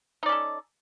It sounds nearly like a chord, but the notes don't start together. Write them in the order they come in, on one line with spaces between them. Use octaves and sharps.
D#4 D5 C#4 A4